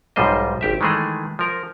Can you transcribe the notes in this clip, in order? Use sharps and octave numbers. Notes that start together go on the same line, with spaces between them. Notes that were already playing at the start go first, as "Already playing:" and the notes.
B1 G#2 F3 G3 C5 D#5
G#1 G4 E5
D#3 E3 G#3 A3 G#4
F3 A#4